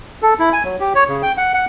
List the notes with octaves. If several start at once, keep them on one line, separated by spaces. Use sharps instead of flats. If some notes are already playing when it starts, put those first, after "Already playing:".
A4
E4
G#5
F#3
G4
C#5
C#3
G5
F#5
F#5